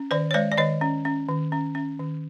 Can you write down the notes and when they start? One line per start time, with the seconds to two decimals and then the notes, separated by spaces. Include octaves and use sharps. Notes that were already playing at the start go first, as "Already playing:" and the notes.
Already playing: C#4
0.11 D#3 C5 D5
0.31 C#5
0.34 G#3 C5 D5
0.52 D5
0.58 D#3 C#5 D#5
0.81 C#4
1.05 C#4
1.29 D#3
1.52 C#4
1.75 C#4
1.99 D#3